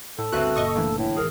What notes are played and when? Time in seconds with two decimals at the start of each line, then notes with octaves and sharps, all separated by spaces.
0.18 A2 A4
0.32 G1 D2 C4 F#4 B4 E5 F#6
0.55 F#1 A#2 D#5 C#6 D#6
0.75 D3 E3 A3 A#3
0.98 A2
1.17 G#1 D#3 G#4 A#4